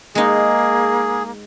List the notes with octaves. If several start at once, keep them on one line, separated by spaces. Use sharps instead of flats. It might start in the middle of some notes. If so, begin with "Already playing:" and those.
G#3 A#3 D#4 G#4